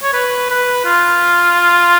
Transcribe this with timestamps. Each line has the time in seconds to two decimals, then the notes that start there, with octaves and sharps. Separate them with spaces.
0.03 C#5
0.13 B4
0.50 B4
0.85 F4